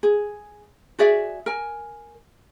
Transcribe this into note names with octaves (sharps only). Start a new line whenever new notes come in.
G#4
F#4 G#4 D5 E5
A#4 G#5